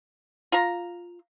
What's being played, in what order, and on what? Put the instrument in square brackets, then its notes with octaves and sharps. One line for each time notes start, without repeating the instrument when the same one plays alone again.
[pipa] F4 A#5